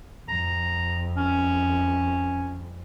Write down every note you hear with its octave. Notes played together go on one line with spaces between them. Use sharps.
F2 A#5
C#4